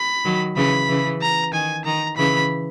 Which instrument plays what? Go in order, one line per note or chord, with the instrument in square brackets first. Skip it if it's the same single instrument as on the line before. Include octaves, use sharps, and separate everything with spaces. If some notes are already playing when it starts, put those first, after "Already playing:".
Already playing: [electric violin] B5
[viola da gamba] D#3 F#3
[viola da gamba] C#3 E3 [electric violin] B5
[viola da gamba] C#3 E3
[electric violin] A#5
[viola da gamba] D#3 [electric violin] G#5
[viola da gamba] D#3 [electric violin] A#5
[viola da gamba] C#3 E3 [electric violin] B5